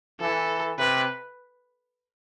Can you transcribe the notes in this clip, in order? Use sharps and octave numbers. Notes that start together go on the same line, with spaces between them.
E3 A4
C3 B4